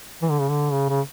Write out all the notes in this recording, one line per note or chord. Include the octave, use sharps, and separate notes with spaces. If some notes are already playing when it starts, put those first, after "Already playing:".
E3
D3
C#3
D3
C#3
C#3